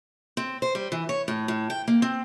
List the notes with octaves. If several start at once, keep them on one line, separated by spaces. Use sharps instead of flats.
C4
C5
G3
E3
C#5
A2
A2
G5
A#3
C4